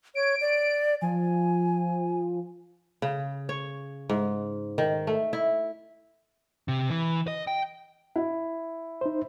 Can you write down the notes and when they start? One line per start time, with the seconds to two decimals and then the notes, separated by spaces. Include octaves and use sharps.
0.15 C#5 D7
0.41 D5
1.02 F3 G#5
3.02 C#3
3.49 C#5
4.09 G#2
4.78 D#3
5.07 A3
5.33 E4
6.68 C3
6.90 E3
7.28 D#5
7.47 G5
8.16 E4
9.01 D#4 C5